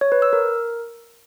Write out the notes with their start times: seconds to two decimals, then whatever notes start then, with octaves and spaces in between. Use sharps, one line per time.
0.01 C#5
0.12 B4
0.22 E6
0.33 A#4